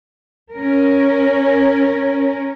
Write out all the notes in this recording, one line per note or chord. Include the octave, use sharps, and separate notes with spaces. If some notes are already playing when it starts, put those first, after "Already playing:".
C#4 A#4